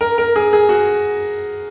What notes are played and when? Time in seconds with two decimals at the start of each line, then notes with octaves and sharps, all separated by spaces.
0.01 A#4
0.18 A#4
0.36 G#4
0.53 G#4
0.69 F#4